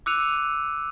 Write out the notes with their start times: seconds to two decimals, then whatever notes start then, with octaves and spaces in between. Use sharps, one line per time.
0.06 D6 E6 F#6 C#7 D#7 F7